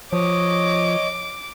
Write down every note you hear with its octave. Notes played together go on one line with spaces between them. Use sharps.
F3 C#5 D#5 D6